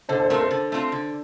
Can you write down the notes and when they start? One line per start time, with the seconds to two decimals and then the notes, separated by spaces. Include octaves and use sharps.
0.09 D3 A4 C5
0.19 A4 C5
0.30 A3 C4 F4 A#4
0.40 A4 C5
0.51 D3
0.72 A3 C4 F4
0.92 D3